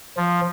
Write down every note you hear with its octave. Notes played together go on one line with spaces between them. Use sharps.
F3